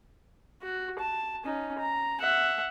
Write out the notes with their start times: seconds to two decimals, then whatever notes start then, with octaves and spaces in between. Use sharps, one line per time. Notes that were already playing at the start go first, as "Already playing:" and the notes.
0.62 F#4
0.99 A5
1.45 C#4 D#4
1.79 A#5
2.21 E5 F#5